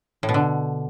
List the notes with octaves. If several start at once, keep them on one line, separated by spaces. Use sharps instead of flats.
A2
B2
D3